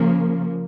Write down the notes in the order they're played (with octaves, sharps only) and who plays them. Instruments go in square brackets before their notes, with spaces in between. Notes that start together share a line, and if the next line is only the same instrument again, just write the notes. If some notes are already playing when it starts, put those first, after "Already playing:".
Already playing: [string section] C#3 F3 A#3